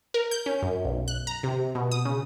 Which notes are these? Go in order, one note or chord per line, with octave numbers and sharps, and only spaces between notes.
A#4
G6
C#4
F#2
B1
F#6
A#5
C3
B2
D#6
C#3